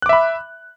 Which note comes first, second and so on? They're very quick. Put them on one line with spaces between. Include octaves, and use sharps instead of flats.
F#6 D6 E5 B5